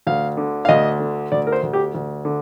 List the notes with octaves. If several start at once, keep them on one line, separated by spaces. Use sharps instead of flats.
D2 F5
D3
F5
D2 D#5
D3
D2 D5
A#4
C5
D2
G4
D2
D3